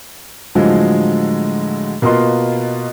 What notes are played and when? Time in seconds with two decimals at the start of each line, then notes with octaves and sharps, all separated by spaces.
0.55 A2 D3 F3 F#3 G#3 G#4
2.02 B2 A#3 B3 F4 D#5 C6